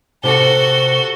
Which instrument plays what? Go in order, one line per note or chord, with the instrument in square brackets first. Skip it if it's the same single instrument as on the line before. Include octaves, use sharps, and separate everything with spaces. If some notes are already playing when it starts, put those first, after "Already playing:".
[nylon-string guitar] C3 A5 [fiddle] F#4 A4 [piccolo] G7